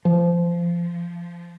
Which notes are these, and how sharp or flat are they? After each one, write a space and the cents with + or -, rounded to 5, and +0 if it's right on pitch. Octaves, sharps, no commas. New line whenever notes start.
F3 -20